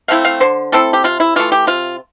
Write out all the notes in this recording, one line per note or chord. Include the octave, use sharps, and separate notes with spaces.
A3 C4 E4 F5
F5
D3 C5
A3 C4 E4 A4
G4
C3 F4
E4
E3 A3 F4
G4
C3 F4